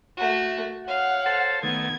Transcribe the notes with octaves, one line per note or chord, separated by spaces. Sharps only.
A3 F#4
C#5 F5 F#5
A4 C5 A5
D#3 A3 B3 G#6